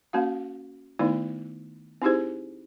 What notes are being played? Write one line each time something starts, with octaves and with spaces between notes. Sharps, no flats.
A#3 C#4 F#4 F5
D#3 A3 B3 D#4 E4 D5
C4 D#4 E4 G4 G#4 C5